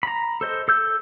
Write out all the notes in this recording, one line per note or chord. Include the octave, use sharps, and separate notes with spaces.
A#5 B5
A4 C5 D#5
A4 E6 G6